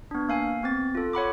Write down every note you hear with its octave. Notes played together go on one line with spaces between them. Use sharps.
B3 D4
A#3 F5 G#5
B3 C4 A6
F4 A4
C#5 F#5 B5 D6